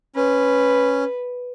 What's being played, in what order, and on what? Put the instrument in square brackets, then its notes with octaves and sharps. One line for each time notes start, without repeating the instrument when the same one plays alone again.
[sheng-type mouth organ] C#4 [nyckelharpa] B4